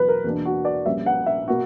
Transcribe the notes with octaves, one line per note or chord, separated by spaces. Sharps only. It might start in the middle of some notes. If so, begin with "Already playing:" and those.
Already playing: E2 B2 F#3 B4
A#4
E2 B2 A#3 D4
F#4
D5
A#1 A#2 G3 C#4 E5
F#5
E5
B2 A#3 F#4